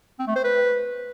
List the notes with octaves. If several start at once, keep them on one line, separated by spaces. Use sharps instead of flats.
C4
A3
C5
B4